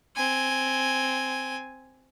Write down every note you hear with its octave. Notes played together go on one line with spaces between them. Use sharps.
C4 G#5